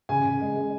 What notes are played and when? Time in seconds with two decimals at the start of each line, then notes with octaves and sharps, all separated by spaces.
0.09 C#3 G#5
0.25 C#3
0.41 G#3
0.57 G#3